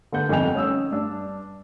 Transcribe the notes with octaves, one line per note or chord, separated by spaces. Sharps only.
D3 B3 F#5 G6
G1 F2 D#4 G5 F7
C#4 D#6 E6
G2 D4 E6